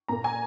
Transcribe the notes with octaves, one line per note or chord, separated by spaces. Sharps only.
A#2 A#3 A#5
G#5